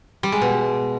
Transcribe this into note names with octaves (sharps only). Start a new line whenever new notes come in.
G3
G#3
B2